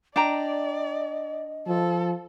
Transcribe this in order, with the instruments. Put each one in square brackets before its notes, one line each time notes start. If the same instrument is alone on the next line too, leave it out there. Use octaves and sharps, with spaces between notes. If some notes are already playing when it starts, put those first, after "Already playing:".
[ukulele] D4 G5 A#5 [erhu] D5 [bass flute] D#5
[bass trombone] F3 [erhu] A4